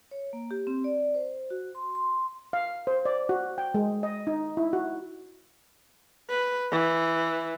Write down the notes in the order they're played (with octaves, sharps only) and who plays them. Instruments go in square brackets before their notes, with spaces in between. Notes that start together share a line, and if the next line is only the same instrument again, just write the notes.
[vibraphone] C#5
A#3
G4
C4
D5
C5
F#4
C6
C6
[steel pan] F5
C5
D5
F#4
G5
G#3
D#5
D#4
E4
F#4
[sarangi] B4
E3